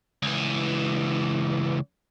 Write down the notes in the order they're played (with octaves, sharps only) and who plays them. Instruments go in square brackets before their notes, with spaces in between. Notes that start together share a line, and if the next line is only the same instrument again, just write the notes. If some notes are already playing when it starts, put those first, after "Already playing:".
[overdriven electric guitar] C#2 E3